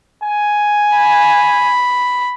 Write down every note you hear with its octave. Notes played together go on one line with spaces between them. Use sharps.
G#5
B5